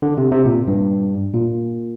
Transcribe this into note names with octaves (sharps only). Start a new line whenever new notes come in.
D3
C3
C3
A#2
G2
A#2